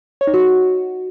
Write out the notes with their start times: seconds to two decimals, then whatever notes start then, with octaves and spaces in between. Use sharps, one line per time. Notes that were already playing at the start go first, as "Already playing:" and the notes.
0.21 C#5
0.27 D#4
0.34 F#4